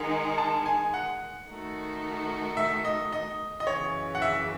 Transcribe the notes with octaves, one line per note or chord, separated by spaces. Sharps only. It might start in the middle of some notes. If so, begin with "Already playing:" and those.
Already playing: D#3 G#3 D#4 F#5
A5
G#5
F#5
D#3 A3 D#4 F#4
E5
D#5
D#5
D#5
F#2 C#3 E3 C#5
F#5
E5